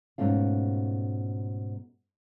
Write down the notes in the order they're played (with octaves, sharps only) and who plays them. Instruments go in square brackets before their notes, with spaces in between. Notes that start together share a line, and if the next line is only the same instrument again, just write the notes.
[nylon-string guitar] G#2 B2 A3 C#4 F4